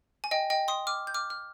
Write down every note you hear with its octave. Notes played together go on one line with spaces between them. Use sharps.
G#5
D#5 G5
D#5 G5
C6 D#6
D6 F6
G6
D6 F6
F6